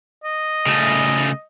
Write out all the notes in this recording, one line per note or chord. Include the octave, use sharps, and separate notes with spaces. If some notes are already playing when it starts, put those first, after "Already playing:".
D#5
C#3 A3